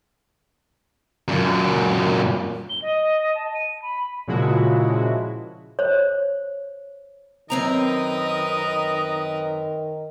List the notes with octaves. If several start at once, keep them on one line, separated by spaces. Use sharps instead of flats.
F#2 A#2
G7
D#5
A5
D#7
B5
A#2 C#3 F3 G#3 E4 F#4
C5 C#5
F#2 D#3 C4 A#4 B4 D#5 A#5